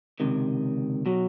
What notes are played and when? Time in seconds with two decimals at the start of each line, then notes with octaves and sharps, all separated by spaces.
0.20 C#2 C3 D#3
1.06 B2 F#3